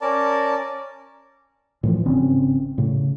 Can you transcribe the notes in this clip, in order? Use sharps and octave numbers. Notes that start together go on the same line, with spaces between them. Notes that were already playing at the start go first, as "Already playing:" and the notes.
C#4 A#4 D5 A5
A2 E3 F3
G#1 C#3 C4 C#4
A2 C#3